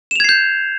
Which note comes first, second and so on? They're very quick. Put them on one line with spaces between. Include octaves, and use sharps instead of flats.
E7 F7 G#6 C7 G6